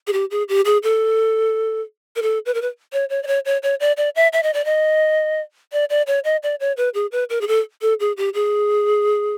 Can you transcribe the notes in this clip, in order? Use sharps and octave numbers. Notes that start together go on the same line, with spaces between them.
G#4
G4
G#4
G4
G#4
A4
A#4
A4
B4
A#4
B4
C#5
C#5
D5
C#5
C#5
C#5
D5
D5
E5
E5
D#5
D5
D#5
D5
D5
C#5
D#5
D5
C#5
B4
G#4
B4
A#4
G#4
A4
A4
G#4
G4
G#4